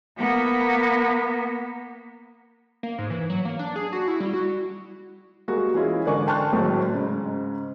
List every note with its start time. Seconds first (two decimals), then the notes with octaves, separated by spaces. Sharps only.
0.17 A#3 B3
2.83 A#3
2.98 G#2
3.10 E3
3.30 F#3
3.45 A#3
3.59 D4
3.76 G#4
3.93 F#4
4.08 E4
4.20 G3
4.33 F#4
5.48 G3 G#3 A#3 F#4
5.74 E3 G#3 C#4 E4 F4
6.05 G#2 D3 A#4 D5 G#5 C#6
6.27 G5 A5 C6 C#6 F6 F#6
6.52 G#1 A2 F#3 G#3
6.94 G#2 C#3